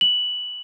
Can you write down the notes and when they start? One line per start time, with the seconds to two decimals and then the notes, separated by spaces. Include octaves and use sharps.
0.01 F#7